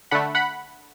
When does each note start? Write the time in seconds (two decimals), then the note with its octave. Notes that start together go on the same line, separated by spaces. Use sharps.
0.11 D3 A3 F#5 B5
0.35 F#5 B5